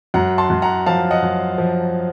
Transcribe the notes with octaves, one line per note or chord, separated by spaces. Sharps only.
F#2 F#5 A#5
A5 C6
F#2
F#5 A#5
F3 F5 A5
D#5 F#5
F#2
F3